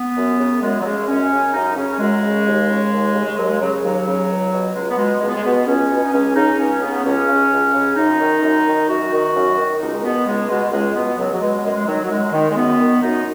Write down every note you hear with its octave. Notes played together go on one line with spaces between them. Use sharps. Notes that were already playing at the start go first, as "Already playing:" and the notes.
Already playing: B3
F#2
C#3
F#2 G#3
F#3
C#3 G#3
F#2 C#4
C#3
F#2 D#4
C#3 C#4
F#2 G#3
C#3
D#2
C#3
D#2
C#3
G#3
D#2 F#3
G#3
C#3 F#3
D#2 F#3
C#3
C#2
B2
C#2 G#3
B3
B2 G#3
C#2 G#3
B3
G#3
B2 B3
C#2 C#4
B2
D#4
C#2 C#4
C#3 D#4
C#2 C#4
C#3 B3
C#2 C#4
C#3
C#2
C#3
F#2 D#4
D#3
F#2
D#3
F#2 F#4
D#3
F#2
D#3
C#2 D#4
G#3
B2 B3
C#2 G#3
B2 G#3
C#2 G#3
B2 B3
C#2 F#3
F#3
B2 G#3
F#2 G#3
G#3
D#3 F#3
F#3
F#2 G#3
D#3
G#3
F#2 B3
D#3
F#2 D#4